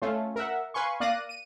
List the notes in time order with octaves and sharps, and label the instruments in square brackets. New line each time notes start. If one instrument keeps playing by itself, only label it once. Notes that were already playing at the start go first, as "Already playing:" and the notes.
[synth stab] A3 C#4 F4
A#4 E5 F#5
B4 F5 G#5 C6 C#6
A#3 D5 F5 F#6 A#6 D#7
D#7